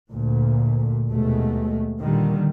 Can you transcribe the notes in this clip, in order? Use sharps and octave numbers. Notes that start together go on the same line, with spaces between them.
D2 A#2
D#2 B2 G#3 A3
A#2 D3 D#3 G3